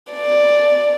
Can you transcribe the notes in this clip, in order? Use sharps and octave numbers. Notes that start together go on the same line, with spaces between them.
D5